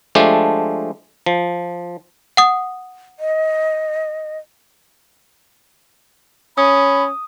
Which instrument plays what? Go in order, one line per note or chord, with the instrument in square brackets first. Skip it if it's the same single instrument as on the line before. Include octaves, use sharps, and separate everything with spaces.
[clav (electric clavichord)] F3 G#3 A3 D4 G4
F3
[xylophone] F#5 D#6
[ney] D#5
[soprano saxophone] C#4 [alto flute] B5 [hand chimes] D#6